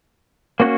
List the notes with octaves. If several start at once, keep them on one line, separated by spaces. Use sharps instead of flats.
A#3 C#4 F#4